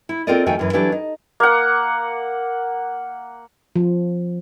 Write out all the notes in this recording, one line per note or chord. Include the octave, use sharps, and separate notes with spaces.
E4
C4 F4 A4 A#4 D5 D#5
F2 D#3 A3 F#4 G5 G#5
F#2 E3
E3 F#3 D4 E4 G4 A4
D#4
A#3 F#5
F3